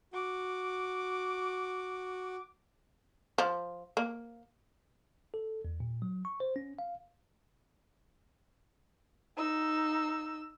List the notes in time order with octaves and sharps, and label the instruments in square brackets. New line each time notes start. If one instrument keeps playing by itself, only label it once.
[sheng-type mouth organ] F#4 [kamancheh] D6
[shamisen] F3
A#3
[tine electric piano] A4
E2
A#2
F#3
C#6
C5
C#4
F5
[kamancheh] D#4 E6